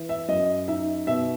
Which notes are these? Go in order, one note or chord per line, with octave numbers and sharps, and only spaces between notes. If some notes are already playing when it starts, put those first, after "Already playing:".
Already playing: E3
E5
F#2 D#5
D#4 E5
B2 E5